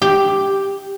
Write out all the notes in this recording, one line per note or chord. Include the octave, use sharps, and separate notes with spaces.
G4